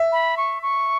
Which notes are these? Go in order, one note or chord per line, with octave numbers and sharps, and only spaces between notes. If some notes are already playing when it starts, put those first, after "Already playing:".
Already playing: E5
B5
C#6
C#6